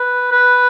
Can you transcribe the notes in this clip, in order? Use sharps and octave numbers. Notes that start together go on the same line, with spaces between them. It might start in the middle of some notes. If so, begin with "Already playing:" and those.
Already playing: B4
B4